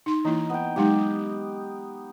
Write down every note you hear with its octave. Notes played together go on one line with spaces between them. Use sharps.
D#4 C6
E3 A#3 D#4 E4
B3 G5
F#3 G#3 D#4 G4